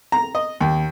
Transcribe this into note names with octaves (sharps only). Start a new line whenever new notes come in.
A#5
D#5
D#2